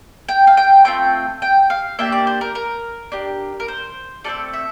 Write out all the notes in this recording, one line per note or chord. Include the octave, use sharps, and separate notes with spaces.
G5
F5
G5
A3 C4 F4 G5
G5
F5
A#3 D4 G4 E5
D5
C5
A#4
A#4
D4 G4
A#4
C5
A3 C4 F4 A4 D5
E5